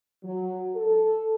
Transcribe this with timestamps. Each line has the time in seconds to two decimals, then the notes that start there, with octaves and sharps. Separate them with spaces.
0.24 F#3
0.75 A4